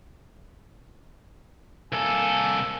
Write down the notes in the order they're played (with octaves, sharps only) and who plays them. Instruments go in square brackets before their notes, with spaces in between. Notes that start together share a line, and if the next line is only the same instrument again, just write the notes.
[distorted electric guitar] C2 A4 [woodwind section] A#3 G#5 E6